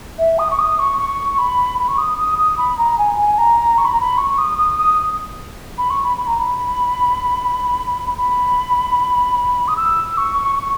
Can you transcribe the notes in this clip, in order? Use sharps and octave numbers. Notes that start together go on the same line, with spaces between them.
E5
D#6
C#6
D#6
C#6
C#6
B5
B5
C#6
D#6
D#6
D#6
B5
A#5
G#5
G#5
A#5
C#6
B5
A#5
B5
C#6
C#6
D#6
D#6
D#6
B5
C#6
B5
B5
A#5
B5
B5
D#6
E6
C#6
C#6